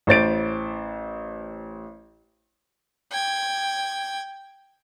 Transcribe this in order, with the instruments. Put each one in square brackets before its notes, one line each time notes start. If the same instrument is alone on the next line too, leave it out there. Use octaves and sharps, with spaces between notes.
[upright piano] A1 C5 A6 D7
[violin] G5 G#6